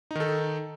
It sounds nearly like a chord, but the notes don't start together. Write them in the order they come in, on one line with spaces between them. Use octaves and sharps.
D#4 D#3 A4